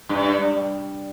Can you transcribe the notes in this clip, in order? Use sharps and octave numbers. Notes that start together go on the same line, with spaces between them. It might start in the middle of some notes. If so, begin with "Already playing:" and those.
G2 D4
G3